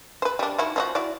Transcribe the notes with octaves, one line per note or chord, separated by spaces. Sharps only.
B4 C5
G3 D4
D#3 E4 F#4
F3 D#4 F#4
E4 F#4 D5